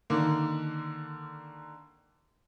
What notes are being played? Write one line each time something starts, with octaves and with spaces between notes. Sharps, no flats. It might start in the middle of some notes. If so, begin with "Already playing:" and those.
D3 D#3 A#3